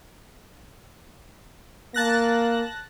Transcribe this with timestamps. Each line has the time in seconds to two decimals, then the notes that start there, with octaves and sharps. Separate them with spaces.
1.94 A#3 A5 F#6 A#6